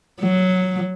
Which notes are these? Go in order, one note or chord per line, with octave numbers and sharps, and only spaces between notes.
F#3